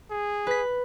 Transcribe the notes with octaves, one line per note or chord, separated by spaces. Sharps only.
G#4
B4 B6